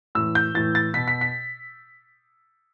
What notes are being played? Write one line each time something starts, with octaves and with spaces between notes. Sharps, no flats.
A2 E3 E6
G6
A2 E3 A6
A6
B2 B6
B6
B6